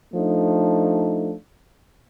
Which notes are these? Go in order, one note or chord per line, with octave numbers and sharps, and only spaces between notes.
F3 A3 D4 D#4